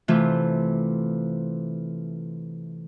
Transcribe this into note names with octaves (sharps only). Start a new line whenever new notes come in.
C3 E3 A3 F4